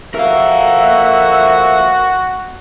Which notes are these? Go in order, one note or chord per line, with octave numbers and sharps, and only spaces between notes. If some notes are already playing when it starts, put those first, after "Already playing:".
F3 F#4 A4 A#4 E5 F5